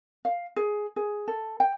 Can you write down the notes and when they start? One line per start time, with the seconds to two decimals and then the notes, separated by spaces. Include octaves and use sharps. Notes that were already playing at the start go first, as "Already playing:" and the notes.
0.25 F5
0.56 G#4
0.96 G#4
1.28 A4
1.60 G5